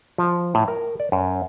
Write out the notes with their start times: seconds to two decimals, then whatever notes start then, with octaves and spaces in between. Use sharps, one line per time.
0.18 F3
0.55 A2
0.68 A#4
1.00 D5
1.12 F#2